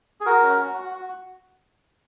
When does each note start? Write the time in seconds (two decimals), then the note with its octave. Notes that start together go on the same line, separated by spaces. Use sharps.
0.21 G#4
0.26 F#4 A#4
0.42 C#4
0.61 F#4
0.78 F#4
0.95 F#4